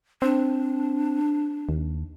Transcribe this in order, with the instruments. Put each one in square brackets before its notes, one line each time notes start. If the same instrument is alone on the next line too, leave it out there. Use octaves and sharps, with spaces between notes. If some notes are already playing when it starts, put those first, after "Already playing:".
[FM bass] C4 [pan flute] D4
[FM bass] D#2